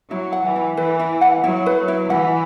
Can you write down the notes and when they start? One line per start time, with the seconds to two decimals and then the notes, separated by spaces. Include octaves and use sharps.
0.11 F#3 E4
0.32 F#5
0.44 E3
0.56 E4
0.77 E3 B4
1.00 E4
1.21 F#5
1.44 F#3 E4
1.66 B4
1.88 E4
2.10 E3 F#5